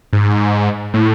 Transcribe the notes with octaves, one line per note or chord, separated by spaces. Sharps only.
G#2
A2